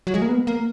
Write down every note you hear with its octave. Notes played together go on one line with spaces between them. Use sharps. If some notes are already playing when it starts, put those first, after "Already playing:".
F#3
G#3
A#3
B3
A#3